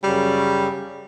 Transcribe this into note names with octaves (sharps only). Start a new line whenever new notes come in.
F#2 C#3 G3